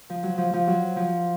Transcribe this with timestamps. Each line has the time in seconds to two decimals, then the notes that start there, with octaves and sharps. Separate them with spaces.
0.10 F3
0.23 F#3
0.38 F3
0.54 F3
0.67 F#3
0.96 F3